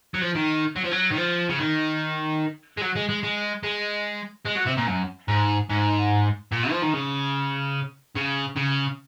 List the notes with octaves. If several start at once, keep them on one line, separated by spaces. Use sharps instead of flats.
F#3
F3
D#3
F#3
F3
F#3
D#3
F3
C#3
D#3
G#3
F#3
G#3
G#3
G#3
G#3
G#3
F#3
C3
A#2
F#2
G#2
G#2
A#2
F3
D#3
C#3
C#3
C#3